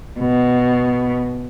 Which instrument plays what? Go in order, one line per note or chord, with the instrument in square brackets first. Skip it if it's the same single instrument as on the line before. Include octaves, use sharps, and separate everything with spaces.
[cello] B2